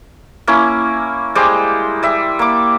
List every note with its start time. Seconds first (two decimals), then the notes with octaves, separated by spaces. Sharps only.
0.47 A#3 C#4 E4
1.35 G3 G#3 C5 D6
2.03 G3 E5
2.39 A#3 D6